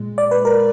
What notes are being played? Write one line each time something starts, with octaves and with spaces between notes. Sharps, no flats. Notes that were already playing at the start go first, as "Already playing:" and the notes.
Already playing: A#2 G#3
D5
B4
A#4